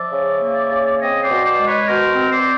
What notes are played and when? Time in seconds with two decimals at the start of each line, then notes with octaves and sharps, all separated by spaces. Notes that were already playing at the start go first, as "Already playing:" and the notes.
Already playing: F3 D5 E5
0.12 C#3
0.41 A#3
0.71 C#3
0.99 C4 C#5 D#5
1.21 C5 D5
1.29 B2
1.43 C5 D5
1.57 G#3
1.64 B4 C#5
1.87 B2 A#4 C5
2.15 C4
2.30 C5 D5